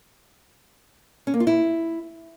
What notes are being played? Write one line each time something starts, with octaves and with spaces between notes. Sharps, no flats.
C#4
A#3
F4
E4